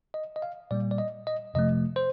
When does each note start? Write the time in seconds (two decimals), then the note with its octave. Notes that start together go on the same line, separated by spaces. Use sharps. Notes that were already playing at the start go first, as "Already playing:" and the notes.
0.14 D#5
0.36 D#5
0.42 F5
0.71 A#2 G3 A#3 D5
0.91 D5
0.98 D#5
1.27 D#5
1.54 F2 C3 F3 A3 D#5
1.96 C5